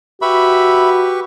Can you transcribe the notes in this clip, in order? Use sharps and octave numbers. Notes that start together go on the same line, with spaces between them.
F#4 G4 B4 E5 B5 C#6